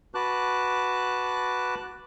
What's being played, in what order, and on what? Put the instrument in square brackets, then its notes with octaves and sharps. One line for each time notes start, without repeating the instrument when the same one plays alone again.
[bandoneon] F#4 B4 A5 D6 F#6